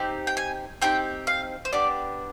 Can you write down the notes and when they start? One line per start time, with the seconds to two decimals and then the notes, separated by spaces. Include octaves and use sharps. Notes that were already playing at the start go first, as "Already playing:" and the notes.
Already playing: C4 D#4 G4
0.27 G5
0.37 G#5
0.82 C4 D#4 G4 G5
1.27 F5
1.65 C5
1.73 B3 D4 G4 D5